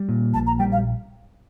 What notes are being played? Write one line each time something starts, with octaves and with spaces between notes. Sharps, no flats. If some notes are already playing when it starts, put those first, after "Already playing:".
Already playing: G3
A#2
A#1 A5
A#5
G3 G5
F5